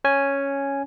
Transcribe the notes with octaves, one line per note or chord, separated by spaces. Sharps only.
C#4 G#5